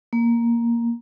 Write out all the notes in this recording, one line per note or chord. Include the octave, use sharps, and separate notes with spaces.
A#3